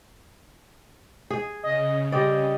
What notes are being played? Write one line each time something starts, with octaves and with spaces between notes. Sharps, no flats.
G#4
C#3 D#5
G3 C4 D5 D#5